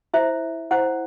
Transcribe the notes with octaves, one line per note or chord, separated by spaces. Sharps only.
E4 C5 E5
E4 C5 F#5